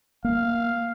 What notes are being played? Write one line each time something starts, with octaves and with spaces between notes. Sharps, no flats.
A#3 F5